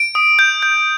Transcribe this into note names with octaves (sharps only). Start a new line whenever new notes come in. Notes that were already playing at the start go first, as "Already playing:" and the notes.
Already playing: D7
D#6
G6
G6